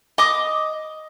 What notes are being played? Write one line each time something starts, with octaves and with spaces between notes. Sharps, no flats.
D#5 D6 D#6